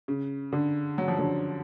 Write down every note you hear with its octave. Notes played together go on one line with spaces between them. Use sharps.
C#3
D3
F#3
F3
D3 F#3